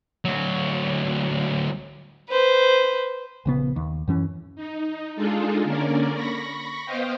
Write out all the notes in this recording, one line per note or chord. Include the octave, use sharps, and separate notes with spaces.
D2 F#3
B4 C5
A#1 C#3 B3
D#2
F#2 E3 C#4
D#4
G#3 D4 D#4 F4 G#4 A4
D3 A#3 C#4 A#4 D5
B5 C#6 A#6
B3 C5 D#5 F5 G5